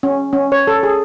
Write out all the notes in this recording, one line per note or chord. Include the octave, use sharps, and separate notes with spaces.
C#4
C#4
C#5
A4
G#4